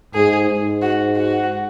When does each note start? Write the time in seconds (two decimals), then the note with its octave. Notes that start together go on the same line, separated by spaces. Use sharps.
0.14 G#2 G#4
0.49 G#2
0.82 F#4
1.15 F#4